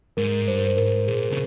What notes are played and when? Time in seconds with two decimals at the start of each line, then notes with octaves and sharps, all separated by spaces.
0.17 G#2 A#4
0.48 G2 C5
0.57 A#4
0.66 C5
0.77 G#2 A#4
1.07 A#2 G#4
1.30 C#3